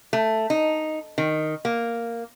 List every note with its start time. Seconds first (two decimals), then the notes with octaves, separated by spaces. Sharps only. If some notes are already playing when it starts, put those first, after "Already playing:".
0.13 A3
0.50 D#4
1.18 D#3
1.65 A#3